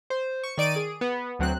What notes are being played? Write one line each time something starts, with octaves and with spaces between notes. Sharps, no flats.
C5
C#6
D#3 D5 D7 D#7
G#4
B3
D2 F#3 C4 F#6